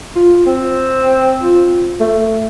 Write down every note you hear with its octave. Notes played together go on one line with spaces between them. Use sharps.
F4
C4
F4
A3